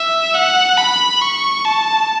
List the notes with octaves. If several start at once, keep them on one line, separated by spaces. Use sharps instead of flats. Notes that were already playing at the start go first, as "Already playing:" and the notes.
Already playing: E5
F#5
B5
C#6
A5